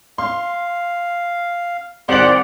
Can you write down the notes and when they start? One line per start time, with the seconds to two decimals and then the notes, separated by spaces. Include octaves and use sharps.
0.18 F5 C6
2.09 C2 D#3 G4 C5 D5 F#5 F#7